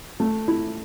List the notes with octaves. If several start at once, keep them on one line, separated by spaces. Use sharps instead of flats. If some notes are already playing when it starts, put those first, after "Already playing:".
A3
E4